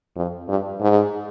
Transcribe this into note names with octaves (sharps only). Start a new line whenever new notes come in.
F2
G2
G#2